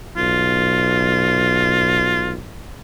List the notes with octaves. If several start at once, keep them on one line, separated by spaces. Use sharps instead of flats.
B1 F4